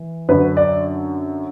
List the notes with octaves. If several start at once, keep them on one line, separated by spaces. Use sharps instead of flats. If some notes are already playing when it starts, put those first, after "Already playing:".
Already playing: E3
F#2 D3 F#3 B4
D5